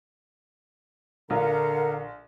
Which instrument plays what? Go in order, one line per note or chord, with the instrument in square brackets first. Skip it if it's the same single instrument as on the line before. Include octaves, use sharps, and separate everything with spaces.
[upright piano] A#1 [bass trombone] D3 [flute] A#4 [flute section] F5 F#5 A#5